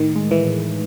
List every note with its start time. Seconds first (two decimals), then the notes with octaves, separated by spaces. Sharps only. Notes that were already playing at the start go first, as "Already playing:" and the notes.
Already playing: A2 D#3
0.16 G#3
0.31 E3
0.45 A2